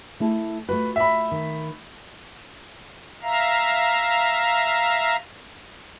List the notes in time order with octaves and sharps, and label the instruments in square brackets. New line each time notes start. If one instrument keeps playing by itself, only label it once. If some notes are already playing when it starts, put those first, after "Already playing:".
[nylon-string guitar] A3 E4 A4
[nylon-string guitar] A3 F4 F#4 [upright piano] B4
[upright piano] E5 B5
[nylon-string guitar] D#3
[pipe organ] E5 F5 A#5